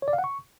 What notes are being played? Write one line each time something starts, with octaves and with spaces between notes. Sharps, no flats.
C#5
D5
F5
F#5
C#6